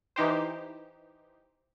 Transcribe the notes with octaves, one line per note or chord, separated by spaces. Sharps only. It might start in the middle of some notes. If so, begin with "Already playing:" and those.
E3 D#4 G4 C5